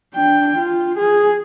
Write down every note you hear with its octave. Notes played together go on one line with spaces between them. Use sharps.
D4 G5
F4
G#4